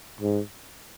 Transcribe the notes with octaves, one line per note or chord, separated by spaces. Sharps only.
G#2